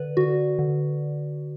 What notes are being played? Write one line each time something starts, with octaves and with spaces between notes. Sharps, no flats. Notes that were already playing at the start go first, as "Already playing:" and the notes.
Already playing: D3 B4 D5
D3 F#4
D3